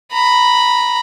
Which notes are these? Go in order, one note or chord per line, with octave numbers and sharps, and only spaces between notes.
A#5 B5